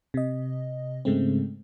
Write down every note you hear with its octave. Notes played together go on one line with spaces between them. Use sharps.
C3 D#5
G#2 C#3 G#3 A3 C4